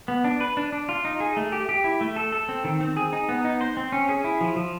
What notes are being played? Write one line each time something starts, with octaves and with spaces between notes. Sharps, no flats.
B3
D4
B4
D4
D4
F4
D#4
G#4
A3
G4
G4
E4
A3
A4
A4
C4
D#3
C4
G#4
D#4
B3
D#4
C5
C4
C#4
G#4
E4
F3
F3